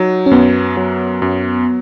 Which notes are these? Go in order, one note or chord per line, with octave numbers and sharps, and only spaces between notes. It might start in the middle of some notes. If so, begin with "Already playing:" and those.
Already playing: F#3 D#4
C#4
F#2 B3
F#3
F#2